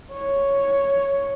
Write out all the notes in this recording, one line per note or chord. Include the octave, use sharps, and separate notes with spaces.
C#5